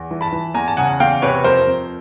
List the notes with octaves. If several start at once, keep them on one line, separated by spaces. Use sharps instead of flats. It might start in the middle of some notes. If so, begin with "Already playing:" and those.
Already playing: E2
E3
A5 B5
E3
E2 G#5 A#5
A5
C#3 F#5 G#5
E2 F5 G5
C3 B4 C#5
F2 A#4 C5
F2